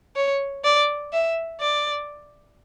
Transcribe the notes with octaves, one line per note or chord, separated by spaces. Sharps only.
C#5
D5
E5
D5